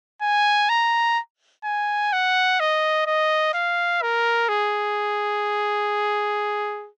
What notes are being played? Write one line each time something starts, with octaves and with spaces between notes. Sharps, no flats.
G#5
A#5
G#5
F#5
D#5
D#5
F5
A#4
G#4